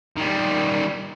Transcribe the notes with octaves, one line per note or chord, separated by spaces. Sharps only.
D#3 G3